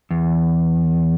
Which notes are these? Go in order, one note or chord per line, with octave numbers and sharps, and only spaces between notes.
E2